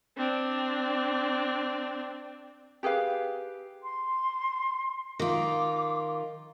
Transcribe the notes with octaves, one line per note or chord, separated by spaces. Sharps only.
C4 D4
G4 G#4 B4 F5
C6
D#3 F4 D6